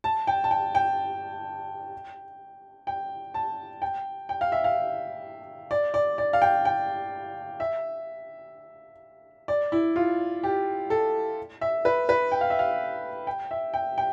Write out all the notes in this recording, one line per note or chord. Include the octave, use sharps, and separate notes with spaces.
A5
G5
A5
G5
G5
G5
A5
G5
G5
F5
E5
F5
D5
D5
D5
F5
G5
G5
E5
D5
E4
F4
G4
A4
E5
B4
B4
G5
F5
E5
F5
G5
E5
G5
G5